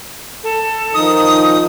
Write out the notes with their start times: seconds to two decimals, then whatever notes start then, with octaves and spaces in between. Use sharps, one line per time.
0.43 A4
0.94 D#3 F3 D#4 D#6